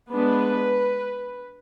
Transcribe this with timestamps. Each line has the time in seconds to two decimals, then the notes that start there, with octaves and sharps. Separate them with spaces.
0.11 G#3 B3 D4 B4